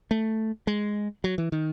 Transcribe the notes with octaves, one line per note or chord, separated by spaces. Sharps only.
A3
G#3
F#3
E3
D#3